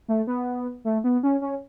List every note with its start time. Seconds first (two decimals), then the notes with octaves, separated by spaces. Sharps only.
0.08 A3
0.27 B3
0.85 A3
1.04 B3
1.23 C#4
1.41 C#4